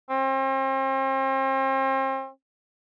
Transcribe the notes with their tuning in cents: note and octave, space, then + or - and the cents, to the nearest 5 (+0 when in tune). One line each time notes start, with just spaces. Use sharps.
C4 +40